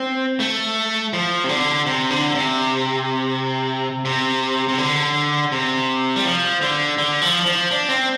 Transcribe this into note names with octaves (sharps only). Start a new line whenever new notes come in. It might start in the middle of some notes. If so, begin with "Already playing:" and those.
Already playing: C4
A3
F3
C3
D3
C3
D3
C3
C3
C3
D3
C3
G3
F3
D3
D3
F3
F3
D4
C4